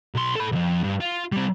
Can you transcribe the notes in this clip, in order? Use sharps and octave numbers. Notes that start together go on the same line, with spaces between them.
B1 C6
A4 B5
C2 F2
G2
F4
G3 C4